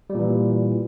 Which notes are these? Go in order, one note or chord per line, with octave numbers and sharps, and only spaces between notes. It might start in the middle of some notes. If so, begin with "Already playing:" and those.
A#2 E3 G3